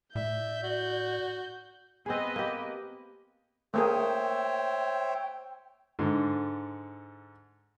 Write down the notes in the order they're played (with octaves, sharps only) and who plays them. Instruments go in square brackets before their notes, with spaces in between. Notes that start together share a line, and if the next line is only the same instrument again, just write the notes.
[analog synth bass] A2 [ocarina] D5 [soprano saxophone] E5 [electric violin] G6
[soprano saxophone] F#4
[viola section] B3 B4 D#5 [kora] C4 G#4
[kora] A#3 G4
[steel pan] A3 A#3 G#4 [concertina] C5 C#5 E5 [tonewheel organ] G5
[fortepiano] G#2 D3